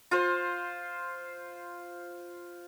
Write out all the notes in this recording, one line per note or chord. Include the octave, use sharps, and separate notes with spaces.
F4 C5